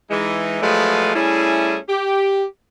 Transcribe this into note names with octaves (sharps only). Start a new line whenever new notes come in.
E3 G#3 D#4
F3 F#3 G#3 A3 B4 F5
G3 A3 C#4 E4 G#4
G4